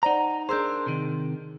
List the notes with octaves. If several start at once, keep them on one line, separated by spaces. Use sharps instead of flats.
D#4 C5 D5 F#5 A#5
D4 G#4 A#4 C5 E6 G6
C3 D#3